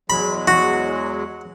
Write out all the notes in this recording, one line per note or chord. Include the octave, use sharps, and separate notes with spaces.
E2 F#3 G#3 B5
F#4